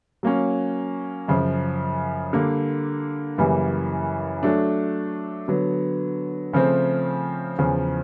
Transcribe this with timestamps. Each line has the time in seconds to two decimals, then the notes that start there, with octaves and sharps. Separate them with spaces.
0.23 F#3 A#3 C#4
1.28 F#2 C#3 F3
2.33 D3 G3 A#3
3.38 F#2 C#3 E3 G3 A#3
4.43 F#3 A3 D4
5.48 D3 F#3 B3
6.53 C#3 F3 A3 C4
7.59 E2 C#3 F3